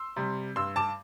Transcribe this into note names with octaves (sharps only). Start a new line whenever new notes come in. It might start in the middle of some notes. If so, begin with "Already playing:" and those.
Already playing: C6 E6
C3 G3
G2 C6 E6
A5 D6